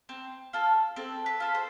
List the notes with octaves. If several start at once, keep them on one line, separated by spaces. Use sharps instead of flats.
C4
F4 A4
C4 A4
B4
F4 A4
A4 C5